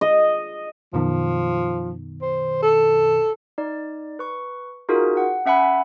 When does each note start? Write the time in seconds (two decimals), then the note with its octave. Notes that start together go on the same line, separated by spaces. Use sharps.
0.01 D#5
0.93 F#2 B2 D#3 F3
2.22 C5
2.63 A4
3.58 D#4 D5
4.19 B4 C#6
4.89 D#4 F4 F#4 G#4 A#4
5.17 F#5
5.46 C#4 E5 F#5 G#5 B5